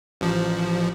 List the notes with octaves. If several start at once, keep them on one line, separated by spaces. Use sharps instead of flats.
A1 F3